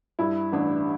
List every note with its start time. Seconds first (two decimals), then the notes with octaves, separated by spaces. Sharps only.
0.19 G2 E4
0.53 A1 D4